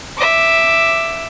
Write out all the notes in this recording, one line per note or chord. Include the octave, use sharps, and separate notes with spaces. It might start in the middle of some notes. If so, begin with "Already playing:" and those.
E5 D6